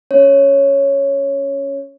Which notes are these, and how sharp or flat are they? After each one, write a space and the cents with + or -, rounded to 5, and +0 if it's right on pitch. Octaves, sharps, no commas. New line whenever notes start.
C#4 +10 C#5 +0